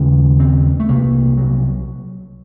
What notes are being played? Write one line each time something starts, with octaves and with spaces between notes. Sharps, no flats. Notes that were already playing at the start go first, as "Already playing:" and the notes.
Already playing: D#2 C#3 C#4
C4
A3
C2 C3 A#3
F#3